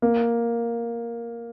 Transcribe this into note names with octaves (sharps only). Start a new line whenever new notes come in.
A#3